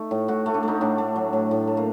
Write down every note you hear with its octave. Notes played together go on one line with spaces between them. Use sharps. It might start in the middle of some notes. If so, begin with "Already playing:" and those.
Already playing: A3 D#4
A2
A2 F#4
A3
D4
A3 D#4
A2 D4
A3
F#3
A2
A2
A3
A#3